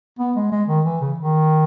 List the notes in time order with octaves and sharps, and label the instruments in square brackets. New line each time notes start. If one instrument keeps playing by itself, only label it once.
[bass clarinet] B3
G#3
G#3
D#3
E3
C#3
D#3